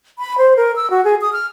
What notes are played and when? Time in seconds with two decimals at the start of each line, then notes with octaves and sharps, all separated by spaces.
0.19 B5
0.38 C5
0.57 A#4
0.76 E6
0.91 F#4
1.05 G#4
1.21 D#6
1.33 F6